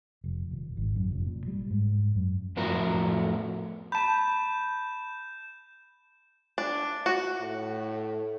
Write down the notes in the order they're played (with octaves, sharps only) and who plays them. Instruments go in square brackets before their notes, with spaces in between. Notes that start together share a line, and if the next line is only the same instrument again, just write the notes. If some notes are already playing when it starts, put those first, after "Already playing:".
[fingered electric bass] F1
D#1
G#1
F#2
F1
A#2
G3
G#2
F#2
[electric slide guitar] F2 A2 B3 E4 F#4 A#4
[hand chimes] A5 B5 [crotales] G6 E7
[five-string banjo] D4
F#4
[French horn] A2